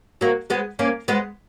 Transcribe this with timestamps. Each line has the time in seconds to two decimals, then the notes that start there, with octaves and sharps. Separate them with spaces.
0.21 F#3 A#3
0.50 G#3 B3
0.79 A#3 C#4
1.08 G#3 B3